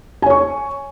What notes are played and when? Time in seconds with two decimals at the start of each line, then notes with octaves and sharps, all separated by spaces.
0.22 G#5
0.26 C#5
0.30 C#6